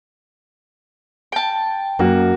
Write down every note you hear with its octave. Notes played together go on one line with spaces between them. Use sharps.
G5 A5
F#2 A#3 F#4